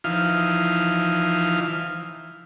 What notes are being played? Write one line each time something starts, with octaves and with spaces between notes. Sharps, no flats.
E3 F3 D#4 F5 F6